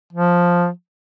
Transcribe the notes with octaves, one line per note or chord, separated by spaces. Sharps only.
F3